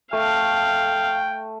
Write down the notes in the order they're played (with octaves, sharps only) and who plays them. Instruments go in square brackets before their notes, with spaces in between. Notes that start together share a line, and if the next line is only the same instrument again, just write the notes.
[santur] A3 [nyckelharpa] F5 [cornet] G5